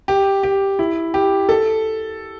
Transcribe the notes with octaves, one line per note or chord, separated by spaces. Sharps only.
G4
G4
E4
G4
A4